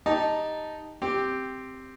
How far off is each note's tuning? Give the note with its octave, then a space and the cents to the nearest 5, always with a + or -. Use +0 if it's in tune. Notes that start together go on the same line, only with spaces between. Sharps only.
D#4 +0 G4 +20 A5 +0
C4 +0 G4 +0